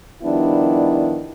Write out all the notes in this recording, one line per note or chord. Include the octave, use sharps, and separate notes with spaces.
D#3 F3 G3 B3 D4 E4